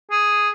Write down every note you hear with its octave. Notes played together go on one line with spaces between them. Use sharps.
G#4